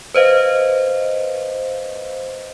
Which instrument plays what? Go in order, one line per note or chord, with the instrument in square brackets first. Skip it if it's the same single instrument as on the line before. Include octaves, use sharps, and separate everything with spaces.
[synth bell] B4 C5 D#5 F5